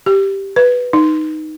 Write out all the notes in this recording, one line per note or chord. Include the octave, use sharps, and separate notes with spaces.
G4
B4
D#4